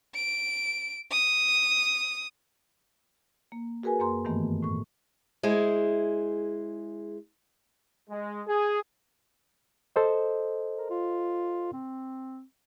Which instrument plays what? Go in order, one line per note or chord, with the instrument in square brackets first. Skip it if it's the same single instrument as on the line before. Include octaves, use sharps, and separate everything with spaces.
[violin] D7
D#6
[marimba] A#3
F#4 G#4 A#4 B4 G#5
F#2 A#3 A#5 C6
G2 D#3 E3 A3 B3
A2 C#6
[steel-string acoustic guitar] G#3 E4 G#4 C5
[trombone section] G#3
G#4
[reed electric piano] A4 C5 D#5
[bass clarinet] A#4
F4
C4